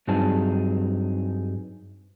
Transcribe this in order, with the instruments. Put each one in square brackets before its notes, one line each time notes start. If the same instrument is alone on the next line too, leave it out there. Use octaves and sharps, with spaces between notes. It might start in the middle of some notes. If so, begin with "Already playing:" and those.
[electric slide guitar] G2 F#3 C4 D#4 G#4 A5